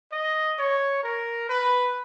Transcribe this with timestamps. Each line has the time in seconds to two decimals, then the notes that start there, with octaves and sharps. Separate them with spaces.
0.12 D#5
0.58 C#5
1.03 A#4
1.49 B4